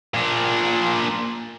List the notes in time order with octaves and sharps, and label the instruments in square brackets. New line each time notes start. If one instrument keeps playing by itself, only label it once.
[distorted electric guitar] A#2 D4